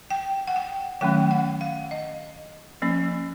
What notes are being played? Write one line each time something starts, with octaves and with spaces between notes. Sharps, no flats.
G5
F#5
G5
D#3 F#3 A3 C#4 G5
F#5
F5
D#5
F3 A#3 C#4